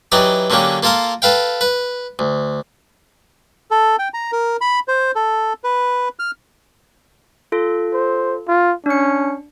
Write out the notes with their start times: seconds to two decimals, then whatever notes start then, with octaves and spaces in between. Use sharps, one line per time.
0.12 E3 F#3 D#4 G4 D5 D#5
0.50 D3 F#3 A#3 C#4 G4
0.83 A#3 F4 A4 A#4 D#6
1.22 A4 B4 F5 G5
1.61 B4
2.19 D2
3.71 A4
3.99 G5
4.14 A#5
4.32 A#4
4.61 B5
4.88 C5
5.15 A4
5.64 B4
6.19 F6
7.52 F4 A4
7.93 C5
8.48 F4
8.86 C#4 D4 C#7